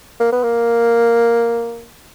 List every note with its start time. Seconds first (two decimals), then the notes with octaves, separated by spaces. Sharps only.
0.20 A#3
0.32 B3
0.43 A#3